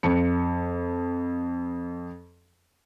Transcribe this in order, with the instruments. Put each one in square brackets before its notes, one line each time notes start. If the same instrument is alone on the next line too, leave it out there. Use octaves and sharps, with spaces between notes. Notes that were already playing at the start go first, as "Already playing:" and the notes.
[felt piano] F2 C#7